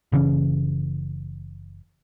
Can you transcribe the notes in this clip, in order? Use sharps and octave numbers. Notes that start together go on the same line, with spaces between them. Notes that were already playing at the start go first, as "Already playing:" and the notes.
F#1 C#3 E3 C#4